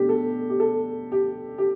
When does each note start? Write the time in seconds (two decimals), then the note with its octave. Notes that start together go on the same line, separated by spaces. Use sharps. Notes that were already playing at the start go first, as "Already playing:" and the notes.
Already playing: B2 A3 D4 G4
0.09 A4
0.50 G4
0.60 A4
1.12 G4
1.58 G4